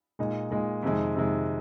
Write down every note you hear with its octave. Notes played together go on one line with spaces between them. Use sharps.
A#2 G#3 D#4
A#2 G#3 D#4
F2 C3 D#3 G#3
F2 C3 D#3 G#3